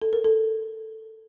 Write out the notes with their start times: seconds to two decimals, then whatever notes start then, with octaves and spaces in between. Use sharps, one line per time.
0.02 A4
0.13 A#4
0.25 A4